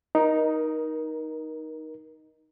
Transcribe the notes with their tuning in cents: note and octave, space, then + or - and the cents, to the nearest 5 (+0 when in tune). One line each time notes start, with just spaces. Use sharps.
D#4 +0 A#4 +25